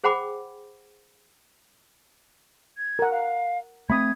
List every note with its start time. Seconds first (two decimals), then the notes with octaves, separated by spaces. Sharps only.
0.04 G#4 C5 F#5 G5 B5 D6
2.77 G#6
2.99 A#4 F#5
3.11 F5
3.90 A3 C4 B5 D#6 G#6